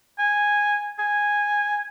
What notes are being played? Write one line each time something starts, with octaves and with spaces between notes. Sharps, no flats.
G#5
G#5